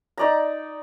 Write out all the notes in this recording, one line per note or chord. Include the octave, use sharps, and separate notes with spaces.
D#4 D5 A#5